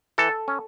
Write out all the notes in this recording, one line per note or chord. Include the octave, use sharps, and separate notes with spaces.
E3 A4
C#4